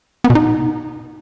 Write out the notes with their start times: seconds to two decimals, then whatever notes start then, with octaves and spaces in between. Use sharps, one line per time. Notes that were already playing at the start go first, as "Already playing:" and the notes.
0.24 B3
0.30 B2
0.35 D#4